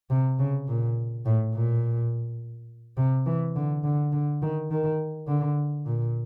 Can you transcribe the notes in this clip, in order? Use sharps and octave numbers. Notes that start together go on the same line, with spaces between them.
C3
C#3
A#2
A2
A#2
C3
E3
D3
D3
D3
D#3
D#3
D3
A#2